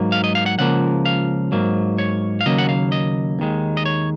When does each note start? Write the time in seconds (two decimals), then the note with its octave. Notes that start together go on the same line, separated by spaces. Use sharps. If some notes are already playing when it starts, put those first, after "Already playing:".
Already playing: G#2 F#3 A#3
0.12 F5
0.24 D#5
0.35 F5
0.46 F#5
0.58 C#2 C#3 F3 A#3 F#5
1.06 F5
1.52 G#2 F#3 A#3
1.98 C#5
2.41 F5
2.46 D#2 C#3 F#3 A#3 D#5
2.58 F#5
2.69 F5
2.92 D#5
3.39 D#2 D#3 G#3
3.77 D#5
3.86 C#5